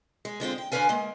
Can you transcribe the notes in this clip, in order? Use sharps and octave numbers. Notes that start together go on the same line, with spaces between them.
G#3
D3 G#3 C4 F4
G5
D2 D3 C#4 B4 F5 G#5
G#3 A#3